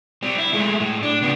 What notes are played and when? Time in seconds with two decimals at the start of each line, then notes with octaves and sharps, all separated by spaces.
0.22 G3 C4
0.38 E4
0.53 G#3 A3
0.80 A2
1.03 D4
1.22 C#3 B3